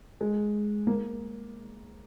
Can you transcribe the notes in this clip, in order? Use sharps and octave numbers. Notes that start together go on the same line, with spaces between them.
G#3
A#3